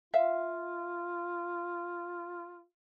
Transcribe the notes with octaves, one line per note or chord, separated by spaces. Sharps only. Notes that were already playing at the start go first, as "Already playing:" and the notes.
F4 E5 F5